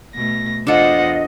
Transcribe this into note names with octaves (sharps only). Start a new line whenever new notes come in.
B2 A3 A#6
E2 D4 F4 A4 C5 D#5 F#5